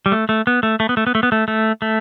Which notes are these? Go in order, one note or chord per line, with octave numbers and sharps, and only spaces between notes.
G3
A3
A3
B3
A3
A3
B3
A3
B3
A3
B3
A3
A3
A3